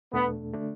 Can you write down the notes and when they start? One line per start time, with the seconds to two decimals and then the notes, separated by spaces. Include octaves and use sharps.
0.13 E2 B2 A3 B3 D4 A4
0.54 D3 A3 D4